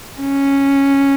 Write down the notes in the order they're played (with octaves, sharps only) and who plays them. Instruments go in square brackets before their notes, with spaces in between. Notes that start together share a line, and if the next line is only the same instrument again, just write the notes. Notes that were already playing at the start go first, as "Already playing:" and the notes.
[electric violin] C#4